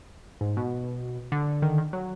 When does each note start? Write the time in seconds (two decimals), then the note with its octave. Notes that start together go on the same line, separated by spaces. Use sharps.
0.41 G#2
0.57 B2
1.32 D3
1.62 D#3
1.78 D#3
1.93 F#3